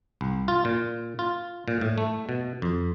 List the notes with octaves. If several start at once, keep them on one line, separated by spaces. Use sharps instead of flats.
C2
F4
A#2
F4
A#2
A2
A3
B2
F2